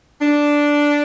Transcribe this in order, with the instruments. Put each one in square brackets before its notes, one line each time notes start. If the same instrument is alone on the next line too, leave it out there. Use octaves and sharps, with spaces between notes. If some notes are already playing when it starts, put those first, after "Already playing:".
[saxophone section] D4